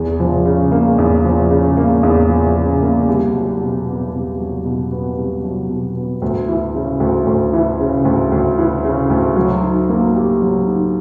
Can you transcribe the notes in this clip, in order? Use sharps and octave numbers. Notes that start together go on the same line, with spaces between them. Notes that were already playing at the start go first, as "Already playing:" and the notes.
Already playing: E2
F3
C#3
A#3
E2
F3
C#3
A#3
E2
F3
C#3
A#3
C2
F#3
B2
B3
C2
F#3
B2
B3
C2
F#3
B2
B3
D2
E3
C#3
D2
D2
E3
C#3
D2
D2
E3
C#3
D2
F#3
D#4
A#3
G4
F#3
D#4